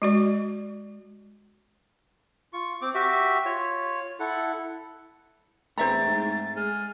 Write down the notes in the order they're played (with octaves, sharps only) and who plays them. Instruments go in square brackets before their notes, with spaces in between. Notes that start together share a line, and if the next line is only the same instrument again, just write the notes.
[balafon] G#3 F#4 D5
[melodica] F4 C#6
C4 D6
F#4 G4 E5
F4 C#5
E4 A4 F#5
[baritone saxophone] E2 [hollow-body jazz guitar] A3 C4 [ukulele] C5 E5 A#5 [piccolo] A6
[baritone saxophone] G#2
[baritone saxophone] G#3 [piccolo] F6